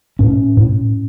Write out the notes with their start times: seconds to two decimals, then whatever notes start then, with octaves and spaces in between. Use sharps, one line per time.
0.19 A2 C#4
0.57 A2